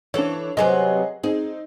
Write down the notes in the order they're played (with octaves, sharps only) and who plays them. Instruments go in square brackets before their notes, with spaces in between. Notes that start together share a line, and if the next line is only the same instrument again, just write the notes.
[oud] E3 A4 [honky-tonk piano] D4 C#5
[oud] C3 F#3 B3 [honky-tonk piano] G#4 D#5
[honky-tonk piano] C4 D#4 [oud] G#4